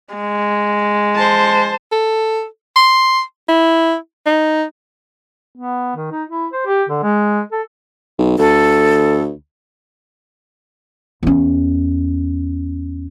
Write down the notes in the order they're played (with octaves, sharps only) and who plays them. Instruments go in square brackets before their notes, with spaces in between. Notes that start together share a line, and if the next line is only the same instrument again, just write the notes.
[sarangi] G#3
[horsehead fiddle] C5 A5
[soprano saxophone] A4
C6
E4
D#4
[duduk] B3
D#3
D#4
E4
C5
G4
D3
G#3
A4
[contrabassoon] B1
[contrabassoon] D2 [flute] A4
[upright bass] E2 C#4